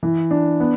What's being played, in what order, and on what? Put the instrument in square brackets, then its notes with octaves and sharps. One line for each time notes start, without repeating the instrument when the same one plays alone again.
[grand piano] E3
D4
B3